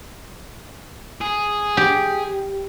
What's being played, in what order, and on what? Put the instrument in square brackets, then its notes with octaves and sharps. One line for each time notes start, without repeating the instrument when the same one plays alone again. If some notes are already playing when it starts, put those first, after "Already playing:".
[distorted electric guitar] G#4
[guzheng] G4